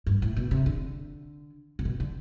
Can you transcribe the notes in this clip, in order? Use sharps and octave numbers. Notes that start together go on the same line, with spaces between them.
G2
A2
B2
C3
D3
C3
B2
D3